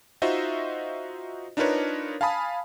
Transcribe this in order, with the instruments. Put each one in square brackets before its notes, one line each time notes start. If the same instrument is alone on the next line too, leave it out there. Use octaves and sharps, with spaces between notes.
[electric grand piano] D#4 F4 F#4 C5 D#5 E5
D4 D#4 F4 A#4 B4 C#5
F5 G#5 A5 B5 D#6